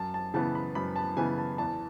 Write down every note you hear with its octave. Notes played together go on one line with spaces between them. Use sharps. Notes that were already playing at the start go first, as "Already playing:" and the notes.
Already playing: F#2 A5
A5
C#3 E3 B3 A5
B5
F#2 B5
A5
C#3 E3 B3 G#5
A5
E2 A5